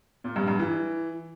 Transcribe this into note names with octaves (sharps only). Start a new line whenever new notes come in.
A#2
G2
G2
E3